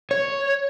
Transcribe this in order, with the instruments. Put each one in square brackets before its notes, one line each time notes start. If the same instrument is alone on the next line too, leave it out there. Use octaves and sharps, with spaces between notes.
[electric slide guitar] C#5